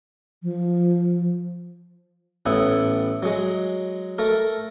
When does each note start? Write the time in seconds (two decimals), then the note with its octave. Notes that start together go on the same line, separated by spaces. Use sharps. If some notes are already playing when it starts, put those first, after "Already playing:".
0.43 F3
2.46 A1 A2 B3 E4
3.23 F#3 G#3
4.18 A3 A#4